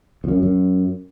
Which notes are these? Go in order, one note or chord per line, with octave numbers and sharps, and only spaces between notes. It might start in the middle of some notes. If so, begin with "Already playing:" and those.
F2
F#2
F#2